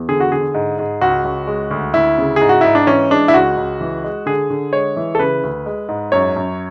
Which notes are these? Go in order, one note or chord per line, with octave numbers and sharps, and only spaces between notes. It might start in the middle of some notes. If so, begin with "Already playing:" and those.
Already playing: E2
D3 G#4
F#4
D3 G#4
G#2
G#2
C#2 F#4
C#2
G#3
D2
D2 E4
C#3
G#2 G#4
F#4
G#2 E4
D4
E3 C#4
G#3 D4
E4
C#2 F#4
C#2
E3
G#3
D3 G#4
D3
G#3 C#5
E3
A4
C#3 B4
D2
G#3
G#2
F#2 C#5
F#2